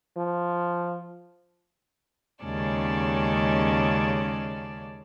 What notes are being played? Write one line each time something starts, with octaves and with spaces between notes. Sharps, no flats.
F3
D#2 C#3 G#3 C#4 D5 A5